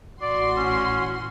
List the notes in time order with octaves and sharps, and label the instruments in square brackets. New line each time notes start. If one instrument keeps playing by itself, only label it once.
[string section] A1 F#4 C6 [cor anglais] D5
[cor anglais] C#4